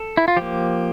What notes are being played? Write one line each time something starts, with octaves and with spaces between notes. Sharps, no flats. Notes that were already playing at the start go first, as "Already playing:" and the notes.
Already playing: A4
E4
F4
F3 A#3 G4